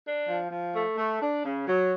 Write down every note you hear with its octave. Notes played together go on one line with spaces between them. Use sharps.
D4
F3
F3
A3
A3
D4
C#3
F#3